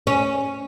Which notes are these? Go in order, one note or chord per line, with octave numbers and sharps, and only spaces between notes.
C#4